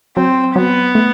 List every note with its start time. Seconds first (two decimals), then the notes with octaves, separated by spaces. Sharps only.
0.17 F#3 C4
0.55 F#3 B3
0.95 A3